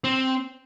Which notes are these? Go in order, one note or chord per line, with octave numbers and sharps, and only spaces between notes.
C4